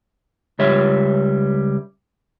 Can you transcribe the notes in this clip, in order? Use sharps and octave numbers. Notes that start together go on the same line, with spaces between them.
C#2 G3 C#5 E5